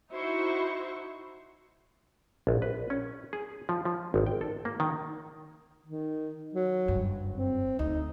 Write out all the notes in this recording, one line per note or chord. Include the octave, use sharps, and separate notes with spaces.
D#4 E4 F#4 C5 C#6
A#1
B4
C#4
G#4
F3
F3
G#1
G5
A4
A#3
D#3
D#3
F#3
F#1 G2
C4
D2 D#4